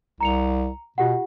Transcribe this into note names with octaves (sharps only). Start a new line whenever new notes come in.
C2 A#5 C#7 F7
B2 F4 G4 F#5